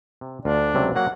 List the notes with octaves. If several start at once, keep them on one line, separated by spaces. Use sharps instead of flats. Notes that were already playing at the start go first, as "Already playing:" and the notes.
C3
D2 D4 F4
C#2 C3 F#3
F#3 A#3 F#5